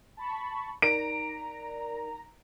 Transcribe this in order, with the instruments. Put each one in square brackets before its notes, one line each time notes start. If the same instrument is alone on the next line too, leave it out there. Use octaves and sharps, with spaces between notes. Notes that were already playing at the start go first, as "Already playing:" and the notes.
[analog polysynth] A5 B5 C#6
[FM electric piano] D#4 A#4 D5 [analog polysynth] A#5 [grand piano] D7